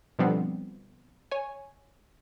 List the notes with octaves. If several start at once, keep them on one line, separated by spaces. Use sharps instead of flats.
B2 D3 F3 G3 B3 C4
C#5 G#5